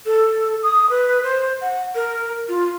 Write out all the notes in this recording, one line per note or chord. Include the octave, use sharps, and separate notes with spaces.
A4
D#6
B4
C5
F#5
A#4
F4